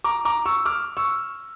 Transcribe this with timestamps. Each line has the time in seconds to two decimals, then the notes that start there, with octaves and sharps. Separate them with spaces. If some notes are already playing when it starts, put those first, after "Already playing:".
0.04 A#5 D6
0.25 A#5 D6
0.45 C#6 E6
0.65 D6 F6
0.97 C#6 E6